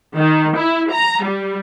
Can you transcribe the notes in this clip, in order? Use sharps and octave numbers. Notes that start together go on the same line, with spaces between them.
D#3
E4
A#5
G3